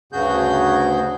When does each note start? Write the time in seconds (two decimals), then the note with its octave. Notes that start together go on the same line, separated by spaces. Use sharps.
0.13 D2 G2 C#3 F#4 G#4 G6